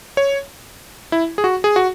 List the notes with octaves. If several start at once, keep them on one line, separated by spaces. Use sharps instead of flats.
C#5
E4
G#4
F#4
G#4
F#4